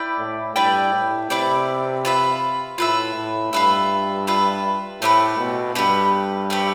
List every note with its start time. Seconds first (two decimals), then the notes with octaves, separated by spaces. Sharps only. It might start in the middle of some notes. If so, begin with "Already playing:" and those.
Already playing: E4 B4 D5 G5
0.18 A2
0.56 G2 E4 B4 D5 G5
0.92 A2
1.30 C3 E4 B4 D5 G5
2.05 F4 B4 E5
2.78 A2 F4 B4 E5
3.16 A2
3.53 G2 F4 B4 E5
4.27 F4 B4 E5
5.01 A2 A3 C4 G4 B4
5.39 B2
5.75 G2 A3 C4 G4 B4
6.50 A3 C4 G4 B4